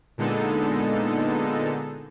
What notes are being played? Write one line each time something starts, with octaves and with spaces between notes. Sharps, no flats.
A#2 D3 G#3 B3 D#4 A4